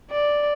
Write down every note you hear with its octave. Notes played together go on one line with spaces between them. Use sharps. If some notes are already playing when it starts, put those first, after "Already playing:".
D5